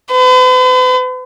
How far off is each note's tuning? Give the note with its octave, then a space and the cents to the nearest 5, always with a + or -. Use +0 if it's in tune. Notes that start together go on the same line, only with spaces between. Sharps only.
B4 +45